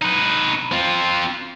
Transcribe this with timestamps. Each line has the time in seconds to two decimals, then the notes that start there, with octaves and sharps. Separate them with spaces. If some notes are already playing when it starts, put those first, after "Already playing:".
0.01 D#4 B4
0.72 C4 F4